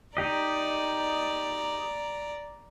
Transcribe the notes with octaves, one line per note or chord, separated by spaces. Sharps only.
D#4 G4 D5 D#5 A#5